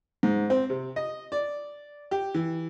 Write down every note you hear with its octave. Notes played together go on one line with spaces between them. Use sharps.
G#2
C4
C3
D#5
D5
G4
E3